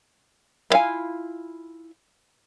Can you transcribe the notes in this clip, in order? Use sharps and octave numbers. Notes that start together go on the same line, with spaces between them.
B3 E4 F4 F5 G#5